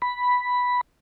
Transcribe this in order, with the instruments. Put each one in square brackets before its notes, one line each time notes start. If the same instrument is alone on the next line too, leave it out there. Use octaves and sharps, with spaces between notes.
[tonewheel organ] B5